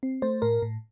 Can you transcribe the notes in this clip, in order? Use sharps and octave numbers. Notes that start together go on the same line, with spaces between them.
C4
A3 C5
A2 A#4
A2